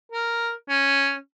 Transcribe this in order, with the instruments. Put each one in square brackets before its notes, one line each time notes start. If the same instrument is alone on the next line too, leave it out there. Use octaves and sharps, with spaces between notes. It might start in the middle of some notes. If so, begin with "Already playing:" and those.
[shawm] A#4
C#4